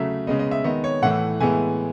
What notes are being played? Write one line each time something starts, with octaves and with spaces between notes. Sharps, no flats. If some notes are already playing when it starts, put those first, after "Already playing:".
Already playing: C#3 F#3 A3 E5
C#3 G#3 B3 D#5
D#5
E5
D#3 G#3 B3 D#5
C#5
A2 E3 A3 F#5
A2 E3 G#3 B3 G#5